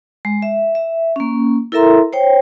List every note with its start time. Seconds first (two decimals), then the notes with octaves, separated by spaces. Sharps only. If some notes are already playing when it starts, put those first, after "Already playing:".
0.25 G#3
0.42 E5
0.75 E5
1.16 A#3 C#4
1.72 E4 A4 A#4 E5 A#5 C6
2.13 C5 C#5 G5